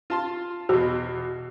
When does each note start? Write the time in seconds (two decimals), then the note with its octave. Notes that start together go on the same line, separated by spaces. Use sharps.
0.10 F4 A5 C6
0.69 E2 B2 F#4